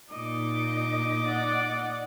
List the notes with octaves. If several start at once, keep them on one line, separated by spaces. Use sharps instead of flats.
A#2 D#4 D#5 D6 D#6
D5 F#5